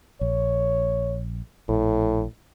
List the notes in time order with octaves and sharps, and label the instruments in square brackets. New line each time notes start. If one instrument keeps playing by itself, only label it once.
[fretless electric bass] A#1 [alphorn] C#5
[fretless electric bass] A#1 [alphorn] A2